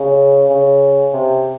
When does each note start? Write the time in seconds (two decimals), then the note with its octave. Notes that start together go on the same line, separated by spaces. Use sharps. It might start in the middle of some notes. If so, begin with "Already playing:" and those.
Already playing: C#3
0.50 C#3
1.13 C3